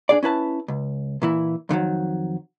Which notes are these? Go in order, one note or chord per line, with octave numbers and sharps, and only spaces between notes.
D4 G#4 D5
C#4 E4 B4 A5
C#2
A#2 E3 E4
F2 D3 D#3 F#3